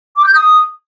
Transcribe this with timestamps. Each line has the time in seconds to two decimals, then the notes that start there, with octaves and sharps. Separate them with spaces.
0.17 D6
0.25 G6
0.34 D#6